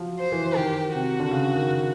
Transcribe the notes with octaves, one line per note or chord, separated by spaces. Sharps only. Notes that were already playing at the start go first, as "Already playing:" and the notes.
Already playing: F3 F#3
C5
E3
D#3 G4
C3 F#4
D3
C#3
D#3